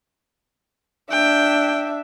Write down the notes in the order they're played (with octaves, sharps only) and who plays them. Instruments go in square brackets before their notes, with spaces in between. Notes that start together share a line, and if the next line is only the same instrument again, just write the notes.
[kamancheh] D4 E5 [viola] G5